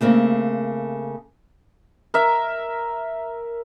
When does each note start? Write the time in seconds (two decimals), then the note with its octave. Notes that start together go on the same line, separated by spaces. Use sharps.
0.01 C#3 A3 A#3 C4
2.14 A#4 E5